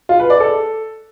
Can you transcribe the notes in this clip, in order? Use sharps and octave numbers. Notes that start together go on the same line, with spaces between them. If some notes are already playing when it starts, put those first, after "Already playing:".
F4
B4
D5
A4